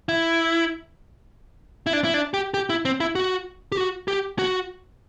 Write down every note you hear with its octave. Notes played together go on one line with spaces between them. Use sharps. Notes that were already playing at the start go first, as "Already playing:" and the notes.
E4
E4
D4
E4
D4
G4
G4
E4
C4
E4
F#4
G4
F#4
G4
F#4